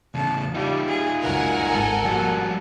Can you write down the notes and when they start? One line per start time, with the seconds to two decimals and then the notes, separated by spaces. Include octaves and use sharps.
0.15 E2 C#3 A5
0.55 G3 D#4 F4
0.88 G#4
1.22 C#2 F#2 F#4 A#4 F#5 G#5
1.72 G#1 G#2 A4
2.05 F3 G3 A#3 F#4